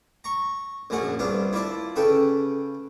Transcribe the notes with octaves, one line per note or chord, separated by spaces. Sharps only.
A#5 C#6
A#1 F#2 A#2 G#4 F#5
C2 B3 D4 F4 F5
E4 F4 D5 A5
C#3 A4 B4 G5